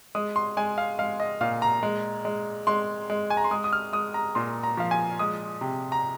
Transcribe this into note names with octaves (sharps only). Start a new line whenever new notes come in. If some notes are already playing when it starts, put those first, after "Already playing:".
G#3 D#6
C6
G#3 G#5
F5
G#3 F5
D#5
A#2 F5
A#5
G#3
G#3
G#3 C6
G#3
G#5
A#5
C6
G#3 D#6
D#6
F6
G#3 D#6
A#5
A#2 C6
A#5
F3 F5
G#5
G#3 D#6
C3
A#5